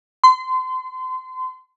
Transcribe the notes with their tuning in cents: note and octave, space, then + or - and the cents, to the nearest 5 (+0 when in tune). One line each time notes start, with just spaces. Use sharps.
C6 -30